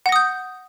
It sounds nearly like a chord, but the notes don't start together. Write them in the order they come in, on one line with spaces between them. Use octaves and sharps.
F#5 A#6 D#6 G6